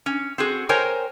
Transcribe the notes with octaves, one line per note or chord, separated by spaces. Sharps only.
C#4
C4 F#4 G#4
A#4 C5 C#5 D#5 G5 G#5